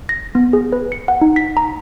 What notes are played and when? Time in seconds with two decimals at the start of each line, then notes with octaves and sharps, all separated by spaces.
0.09 A#6
0.35 B3
0.53 G#4
0.72 B4
0.92 C#7
1.08 F#5
1.21 D#4
1.36 B6
1.57 A#5